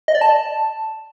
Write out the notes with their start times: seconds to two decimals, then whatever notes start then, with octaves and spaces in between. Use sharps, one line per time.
0.08 D#5
0.15 D5
0.21 A5